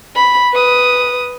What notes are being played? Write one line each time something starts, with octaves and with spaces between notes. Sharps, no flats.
B5
B4 D#6